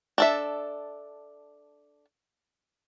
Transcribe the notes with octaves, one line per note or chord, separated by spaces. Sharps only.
D4 A4 E5